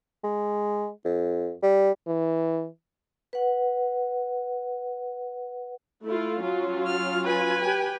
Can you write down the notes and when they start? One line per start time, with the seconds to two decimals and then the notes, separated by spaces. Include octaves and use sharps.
0.24 G#3
1.05 F2
1.62 G3
2.07 E3
3.33 B4 F#5
6.04 A3 E4 F4
6.42 F#3 C#4 F4
6.86 F6
7.24 B4 G#5
7.63 G4 G5